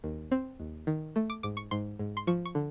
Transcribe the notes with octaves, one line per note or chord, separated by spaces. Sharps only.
D#2
C4
D#2
D#3
A3
D6
G#2 D6
C#6
G#2 C6
G#2
C6
F3 C#6
C#6
D3